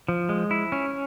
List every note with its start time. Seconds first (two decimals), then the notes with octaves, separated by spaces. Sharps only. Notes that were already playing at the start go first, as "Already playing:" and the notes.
0.08 F3
0.29 G#3
0.51 E4
0.72 C#4